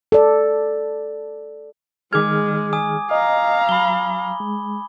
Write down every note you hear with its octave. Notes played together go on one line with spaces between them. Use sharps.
A4 D5
D#3 G#3 G#4 D6 F6 G#6
G#5 D#6
D#5 F5 A#5
F#3 B5 G7
G#3